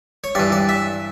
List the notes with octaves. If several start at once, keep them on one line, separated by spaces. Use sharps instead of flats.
C#5
G2 E3 D5
D5
E5